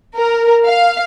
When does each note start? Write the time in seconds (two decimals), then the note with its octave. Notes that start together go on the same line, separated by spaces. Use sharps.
0.17 A#4
0.67 F5